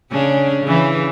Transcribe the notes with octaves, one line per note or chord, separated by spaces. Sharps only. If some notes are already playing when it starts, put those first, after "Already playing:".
C#3 C#4 D4
C#3 E3